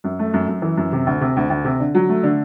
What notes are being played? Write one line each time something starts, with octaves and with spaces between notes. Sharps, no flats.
F#2
A3
F#2
F#2
E3
F#2
C3
D2
C3
D2
D2
C3
D3
F#3
A3
D3